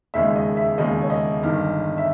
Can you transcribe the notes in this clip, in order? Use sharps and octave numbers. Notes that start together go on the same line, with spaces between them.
E1 D#2 C#3 G#3 D#4 E5
D#5
E5
E1 D#2 C#3 G#3 D#4 D#5
C#5
D#5
G1 G2 D#3
E5